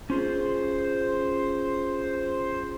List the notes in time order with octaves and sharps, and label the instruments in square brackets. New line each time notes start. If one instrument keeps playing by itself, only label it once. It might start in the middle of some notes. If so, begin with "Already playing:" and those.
[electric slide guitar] C#4 F4 G#4 [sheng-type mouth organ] C5